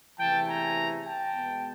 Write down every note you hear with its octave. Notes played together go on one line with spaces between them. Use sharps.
E2 C3 E3 A3 G5 A5
G#5 A#5
G5 A5
B2 G#3 B3